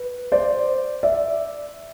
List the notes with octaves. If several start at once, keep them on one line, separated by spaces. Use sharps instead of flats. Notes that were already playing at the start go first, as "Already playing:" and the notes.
Already playing: B4
C5 D5
D5 E5